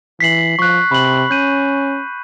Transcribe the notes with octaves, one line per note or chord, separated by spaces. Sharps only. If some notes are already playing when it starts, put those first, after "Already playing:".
E3 B6 C7 F#7
F3 C#6 F#6
C3 B5 F#7
C#4 G6 D#7